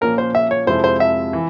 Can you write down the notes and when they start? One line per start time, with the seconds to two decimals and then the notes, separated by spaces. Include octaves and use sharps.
0.01 A#2 F3 A#3 C#4 A#4
0.18 C5
0.35 E5
0.51 C#5
0.67 F2 C3 F3 G#3 E4 C5
0.84 C5
1.00 E5
1.33 E3